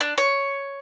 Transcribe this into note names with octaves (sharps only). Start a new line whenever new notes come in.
D4
C#5